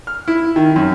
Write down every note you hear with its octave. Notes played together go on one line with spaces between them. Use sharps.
F6
E4
D#3
F#2